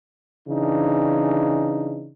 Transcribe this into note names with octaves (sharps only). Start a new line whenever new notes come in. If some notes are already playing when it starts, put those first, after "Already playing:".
C#3 E3 D4 D#4